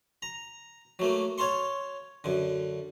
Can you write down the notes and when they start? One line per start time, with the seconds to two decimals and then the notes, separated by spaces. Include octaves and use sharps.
0.22 A#5
0.99 F#3 A3 A#3
1.38 C#5 F5 A5 C6 C#6
2.24 F#2 D3